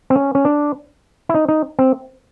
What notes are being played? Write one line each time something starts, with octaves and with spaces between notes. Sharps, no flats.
C4
C#4
C#4
D4
E4
D#4
D#4
C4